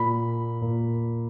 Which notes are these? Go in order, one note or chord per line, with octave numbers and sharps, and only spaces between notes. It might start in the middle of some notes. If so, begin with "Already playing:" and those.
Already playing: A#2 A#3 B5
A#2 A#3